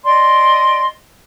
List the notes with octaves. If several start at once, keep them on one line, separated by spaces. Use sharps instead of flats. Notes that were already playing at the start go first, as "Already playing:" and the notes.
D5 D#5 C6